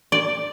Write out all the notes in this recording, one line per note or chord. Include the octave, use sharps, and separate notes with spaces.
D5